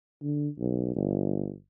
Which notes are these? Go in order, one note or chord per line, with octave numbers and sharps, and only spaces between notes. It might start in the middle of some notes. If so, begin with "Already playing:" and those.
D3
B1
G1